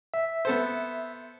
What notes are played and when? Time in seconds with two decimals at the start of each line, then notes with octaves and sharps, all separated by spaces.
0.14 E5
0.45 B3 A4 C5